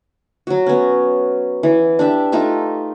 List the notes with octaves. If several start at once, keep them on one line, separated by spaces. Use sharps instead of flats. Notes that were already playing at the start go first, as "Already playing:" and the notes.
F#3 F#4
B3 C#4
E3
D4 G4 E5
A3 D#4 F4 E5